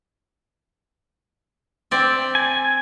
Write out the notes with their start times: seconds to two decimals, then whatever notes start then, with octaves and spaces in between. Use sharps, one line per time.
1.91 C4 D5 E5
2.35 G#5